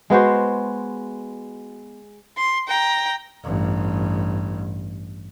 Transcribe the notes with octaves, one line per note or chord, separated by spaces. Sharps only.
G#3 B3 F#4 C5
C6
G5 A#5
A1 G2